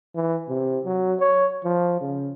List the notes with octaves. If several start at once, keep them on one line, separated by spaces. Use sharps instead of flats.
E3
C3
F#3
C#5
F3
C#3